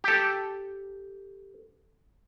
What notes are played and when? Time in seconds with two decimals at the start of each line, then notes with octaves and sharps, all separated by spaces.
0.04 G4 A4